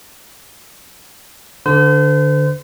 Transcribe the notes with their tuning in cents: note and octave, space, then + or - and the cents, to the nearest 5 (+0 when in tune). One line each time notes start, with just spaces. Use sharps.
D3 +0 C5 -40